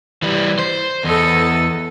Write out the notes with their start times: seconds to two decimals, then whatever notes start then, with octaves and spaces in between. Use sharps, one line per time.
0.22 E3 G3
0.59 C5
1.04 E2 A4 D#5